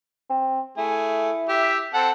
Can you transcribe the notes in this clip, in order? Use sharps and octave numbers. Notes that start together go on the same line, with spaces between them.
C4
A3 E4 G#4
G4 E5
C4 A4 F#5